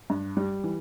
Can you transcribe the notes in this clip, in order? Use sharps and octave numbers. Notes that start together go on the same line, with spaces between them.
G2
G3
E3